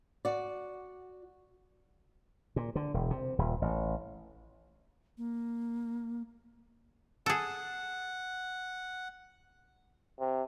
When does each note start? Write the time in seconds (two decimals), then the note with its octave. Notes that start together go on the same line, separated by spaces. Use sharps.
0.25 F#4 D5
2.56 A#2
2.75 D3
2.94 E1
3.11 C3
3.39 D#1
3.62 A1
5.18 A#3
7.26 G#4 A4 F#5
10.20 C3